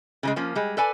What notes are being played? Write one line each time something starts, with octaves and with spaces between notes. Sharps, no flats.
C#3 F3 G#3
F3 A#3 C#4
G3 G#3
A4 B4 D5 G#5